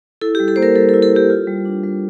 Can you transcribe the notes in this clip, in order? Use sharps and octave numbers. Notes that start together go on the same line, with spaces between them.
E4 A4
G4
G3
A4
A#3 C5
A#4
G3 A4
A4
E4
A4
G3 G4
F4
G3
D4
G3